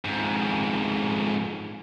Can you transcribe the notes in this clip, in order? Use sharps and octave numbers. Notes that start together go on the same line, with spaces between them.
F2 G#2